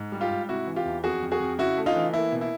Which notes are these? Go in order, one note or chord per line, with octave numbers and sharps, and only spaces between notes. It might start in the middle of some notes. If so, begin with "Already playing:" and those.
Already playing: G#2
G3
F4 G4
G#2
C3 E4 F#4
E3
F4 G4
E2
F2 F#4 G#4
F2
F#4 G#4
F2
C#3 E4 F#4
A3
D#4 F4
E3
A#3 E4
B2
E4